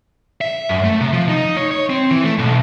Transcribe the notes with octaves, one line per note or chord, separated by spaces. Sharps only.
E5
F#2
A3
C3
F3
D#4
C#5
C#5
C4
E3
A3
B1